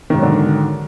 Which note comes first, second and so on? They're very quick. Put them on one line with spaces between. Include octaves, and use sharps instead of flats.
D#3 G#2 F#3 D3